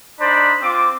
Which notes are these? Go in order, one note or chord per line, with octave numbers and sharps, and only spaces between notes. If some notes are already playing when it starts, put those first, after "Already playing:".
D4 D#4 C5 D5 B5
C4 F4 D6